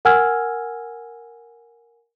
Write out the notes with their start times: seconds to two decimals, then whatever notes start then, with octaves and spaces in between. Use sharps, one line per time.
0.05 A#4 F#5 G#5 E6 F6 G#6